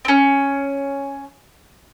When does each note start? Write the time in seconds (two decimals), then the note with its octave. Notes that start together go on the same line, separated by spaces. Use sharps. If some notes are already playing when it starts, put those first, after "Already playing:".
0.05 C4 C#4